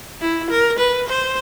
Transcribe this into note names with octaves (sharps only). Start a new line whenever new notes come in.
E4
A#4
B4
C5